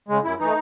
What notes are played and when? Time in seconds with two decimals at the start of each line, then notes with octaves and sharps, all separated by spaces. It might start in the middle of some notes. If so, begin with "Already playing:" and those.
0.08 C#3 G#3
0.24 F#2 E4
0.39 E3 A3 D#4